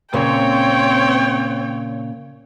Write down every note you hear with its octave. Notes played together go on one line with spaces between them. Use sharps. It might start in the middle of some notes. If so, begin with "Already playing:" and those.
A#2 C#3 C4 C#5 G5